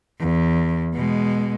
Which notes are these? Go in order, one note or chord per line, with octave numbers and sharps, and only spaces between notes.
E2
B2 G#3